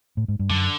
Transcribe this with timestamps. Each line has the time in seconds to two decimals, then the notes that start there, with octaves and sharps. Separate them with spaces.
0.17 A2
0.28 G#2
0.39 G2
0.50 F#2 D3